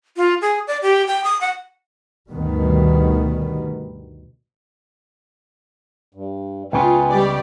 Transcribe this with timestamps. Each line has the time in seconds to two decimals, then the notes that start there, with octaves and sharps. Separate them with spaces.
0.17 F4
0.42 G#4
0.67 D5
0.82 G4
1.07 G5
1.24 D#6
1.41 F#5
2.31 D2 G2 B2 D#3 G3 B3
6.14 G2
6.73 C#2 C#3 B3 F4 B4 G5 G#5
7.08 G3 G4 D5